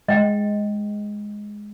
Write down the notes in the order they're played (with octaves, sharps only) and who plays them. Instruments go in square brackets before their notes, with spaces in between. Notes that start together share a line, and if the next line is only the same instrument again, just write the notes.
[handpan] G#3 [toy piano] D#5 G5